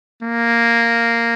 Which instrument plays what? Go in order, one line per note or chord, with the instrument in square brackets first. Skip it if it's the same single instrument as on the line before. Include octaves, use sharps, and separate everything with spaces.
[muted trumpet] A#3